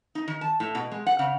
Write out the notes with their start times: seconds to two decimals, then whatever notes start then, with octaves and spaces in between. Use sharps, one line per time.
0.15 D#4
0.28 D#3
0.41 A5
0.60 A2
0.75 B2
0.92 G#3
1.07 F#5
1.19 C#3